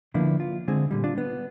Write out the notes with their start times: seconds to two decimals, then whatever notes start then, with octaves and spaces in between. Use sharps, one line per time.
0.14 D3 F3 A#3 B3 D4 E4
0.40 F4
0.68 D3 G#3 C4 G#4
0.91 A#2 D3 G3
1.04 D4 F4
1.18 B3